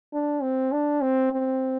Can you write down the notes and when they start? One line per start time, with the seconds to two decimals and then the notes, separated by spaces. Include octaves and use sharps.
0.13 D4
0.42 C4
0.72 D4
1.01 C4
1.32 C4